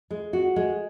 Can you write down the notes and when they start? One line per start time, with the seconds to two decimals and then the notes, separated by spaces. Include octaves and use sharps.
0.10 G#3
0.33 F#4
0.56 G#3